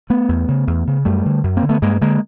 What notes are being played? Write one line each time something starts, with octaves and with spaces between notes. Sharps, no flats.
A3 B3
E2
C#3
E2
C#3
F#2 G3 A3
D3
F#2
A#3 C4
D3
A3 B3
G2 G#3 A#3
D3 G#3 A#3